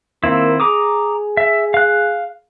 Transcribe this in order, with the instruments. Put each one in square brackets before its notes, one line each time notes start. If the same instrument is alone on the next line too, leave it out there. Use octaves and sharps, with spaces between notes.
[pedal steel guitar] D#3 C4 E4 [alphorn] A#3
[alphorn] G#4 [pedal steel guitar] A#5 D6 D#6
[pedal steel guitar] E5
F5 F#6